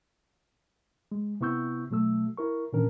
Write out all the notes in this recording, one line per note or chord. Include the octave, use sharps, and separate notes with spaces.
G#3
C3 B3 E4 C#6 E6 G6
B2 F#3 A3 E6
E4 A#4 C#6
A#2 D#3 E3 C#4 D4 A#4